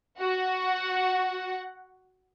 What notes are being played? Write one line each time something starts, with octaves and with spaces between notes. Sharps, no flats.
F#4 F#5